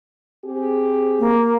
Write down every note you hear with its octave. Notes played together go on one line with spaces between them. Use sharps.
C4 G4 G#4
A#3